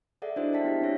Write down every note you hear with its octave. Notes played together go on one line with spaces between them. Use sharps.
G#4 A4 D5 E5 F#5
D4 E4 F#4 C5 D#5
D4 E5 G5 A5 B6
B3 E4 G4
C4 D4 E4 C#5 A#6